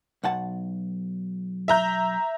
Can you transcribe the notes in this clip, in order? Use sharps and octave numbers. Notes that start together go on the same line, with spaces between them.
B1 F#5 A5
E5 A#5 G6